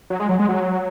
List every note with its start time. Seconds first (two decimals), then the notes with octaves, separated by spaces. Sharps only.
0.10 F#3
0.20 G#3
0.29 F#3
0.39 G#3
0.49 F#3